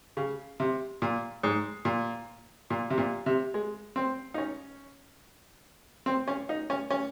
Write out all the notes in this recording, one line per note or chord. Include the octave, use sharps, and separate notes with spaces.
C#3
C3
A#2
G#2
A#2
A#2
C3
A#2
C3
G#3
C4
D#4
C#4
C4
C#4
D#4
C#4
C#4